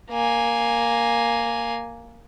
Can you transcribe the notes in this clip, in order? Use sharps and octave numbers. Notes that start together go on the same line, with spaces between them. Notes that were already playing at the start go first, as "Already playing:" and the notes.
A#3 G#5